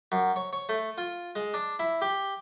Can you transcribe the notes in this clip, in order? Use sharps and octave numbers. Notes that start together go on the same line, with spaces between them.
F#2
C#5
C#5
A3
F4
G#3
D4
E4
G4